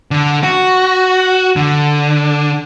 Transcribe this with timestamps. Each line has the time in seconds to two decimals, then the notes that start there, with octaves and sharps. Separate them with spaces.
0.11 D3
0.43 F#4
1.56 D3